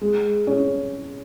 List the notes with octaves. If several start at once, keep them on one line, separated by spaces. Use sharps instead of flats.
G#3
C#4